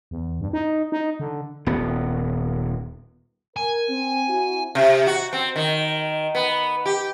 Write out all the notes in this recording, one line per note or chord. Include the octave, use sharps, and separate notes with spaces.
E2
G2
D#4
D#4
D3
D#1 B3
A#4 G#5
C4
C4 E4 F#4
C3
F#4
C4
D#3
B3
G4